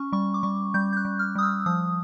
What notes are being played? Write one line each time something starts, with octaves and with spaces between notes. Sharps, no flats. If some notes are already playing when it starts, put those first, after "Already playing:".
Already playing: C#4 C#6
G3 C#6
D6
G3 C#6
G3 G6
G6
F#6
G3
F6
G3 D#6
E6
F3 D#6